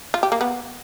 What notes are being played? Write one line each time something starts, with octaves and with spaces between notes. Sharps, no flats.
F4
G4
A#3
B3